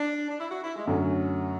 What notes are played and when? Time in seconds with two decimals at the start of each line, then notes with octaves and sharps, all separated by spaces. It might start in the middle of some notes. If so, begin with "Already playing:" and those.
Already playing: D4
0.30 D4
0.40 E4
0.51 F#4
0.64 E4
0.76 G#3
0.86 F#2 D3 F#3 A3 C#4